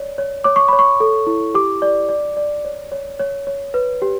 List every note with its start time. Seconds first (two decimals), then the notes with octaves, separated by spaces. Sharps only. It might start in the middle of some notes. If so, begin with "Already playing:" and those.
Already playing: C#5 D5
0.18 C#5
0.44 C#5 D6
0.56 C#6
0.68 C#5 B5
0.79 C#6
1.00 A4
1.27 E4
1.55 G4 D6
1.82 D5
2.09 D5
2.37 D5
2.65 C#5
2.92 C#5
3.19 C#5
3.47 C#5
3.74 B4
4.02 G4